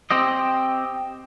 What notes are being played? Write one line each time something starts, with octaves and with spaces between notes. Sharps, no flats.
C4 G4 D#5